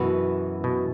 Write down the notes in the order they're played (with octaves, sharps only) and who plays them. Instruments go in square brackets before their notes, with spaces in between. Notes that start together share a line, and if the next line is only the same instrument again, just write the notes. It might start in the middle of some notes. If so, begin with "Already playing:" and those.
Already playing: [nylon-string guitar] F#2 E3 B3 F#4 B4 [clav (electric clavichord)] B2
[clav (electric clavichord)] B2